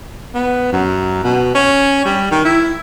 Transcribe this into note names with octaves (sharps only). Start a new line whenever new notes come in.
B3
F#2
B2
C#4
G3
D#3
E4